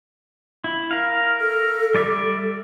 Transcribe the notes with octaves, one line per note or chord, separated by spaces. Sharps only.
E4
A#4 F5
A4
G3 D5 E5